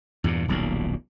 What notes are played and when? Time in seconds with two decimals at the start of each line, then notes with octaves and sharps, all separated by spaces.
0.24 E2 G2 A#2
0.48 D#1 B1 A#2